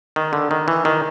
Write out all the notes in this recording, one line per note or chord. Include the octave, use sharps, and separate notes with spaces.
D#3
D3
D#3
E3
D#3